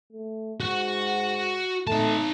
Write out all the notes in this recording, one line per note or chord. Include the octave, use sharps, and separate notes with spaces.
A3
G#2 F#4 F#5
A3 D#4 A5